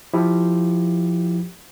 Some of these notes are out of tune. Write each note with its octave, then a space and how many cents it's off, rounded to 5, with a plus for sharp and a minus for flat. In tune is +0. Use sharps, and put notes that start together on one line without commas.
F3 +0 E4 +0 G4 +0